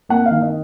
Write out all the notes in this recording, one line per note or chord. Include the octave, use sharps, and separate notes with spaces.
A#3 F#5
F5
D#3
D#5